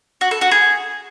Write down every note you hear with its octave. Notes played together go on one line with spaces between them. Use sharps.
F#4
A4
F#4
G#4